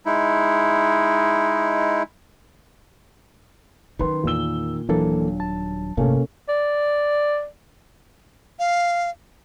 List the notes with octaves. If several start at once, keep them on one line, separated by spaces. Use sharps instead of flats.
G#3 D#4 E4
D#3 F#3 C#4 B4 C6
E2 A#2 A3 E6 G7
D#1 E3 F#3 A#3 D4 A4
A5
G1 A2 C3 A3 A#3 C#4 A4
D5
F5